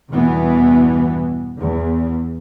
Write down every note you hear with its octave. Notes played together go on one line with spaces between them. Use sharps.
E2 G2 B2 E3 B3
E2